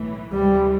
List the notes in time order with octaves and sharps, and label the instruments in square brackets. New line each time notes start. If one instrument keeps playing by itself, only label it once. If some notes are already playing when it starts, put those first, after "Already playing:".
Already playing: [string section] B1 A2 E3 A3
[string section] D2 C3 E3 G#3 [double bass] G3